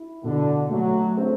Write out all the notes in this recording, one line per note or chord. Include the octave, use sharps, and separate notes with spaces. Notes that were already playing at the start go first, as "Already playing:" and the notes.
Already playing: E4
B2 D3
F#3 A3
C4